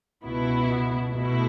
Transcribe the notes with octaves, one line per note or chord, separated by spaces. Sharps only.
C#2 B2 B3 E4
B2 A3 E4